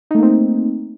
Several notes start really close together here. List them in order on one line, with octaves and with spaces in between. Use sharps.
D#4 A3 A#3 C4